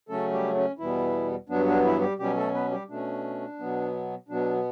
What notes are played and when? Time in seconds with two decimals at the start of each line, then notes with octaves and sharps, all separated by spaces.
0.09 C#3 F#3 A3 C#4 A4
0.32 G3 G4
0.56 C#4
0.79 E2 B2 E3 G3 B3 E4
1.49 G2 F#3 B3 D4
1.67 D4
1.84 E3 E4
2.01 G3 G4
2.18 B2 F#3 G3 C#4 G4
2.37 A3 A4
2.54 B3 B4
2.71 G3 G4
2.89 B2 A3 C#4 D4
3.59 B2 F#3 B3
4.29 B2 F#3 B3 D4